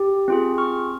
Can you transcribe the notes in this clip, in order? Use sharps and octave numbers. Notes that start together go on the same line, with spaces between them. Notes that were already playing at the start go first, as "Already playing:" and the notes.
Already playing: G4
C4 F4 G#4
C#6 F6